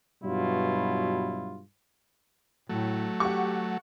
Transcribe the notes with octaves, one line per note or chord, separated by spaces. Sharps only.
G2 B2 F#3 E4 F4
A2 F#3 A3
G4 F#5 C#6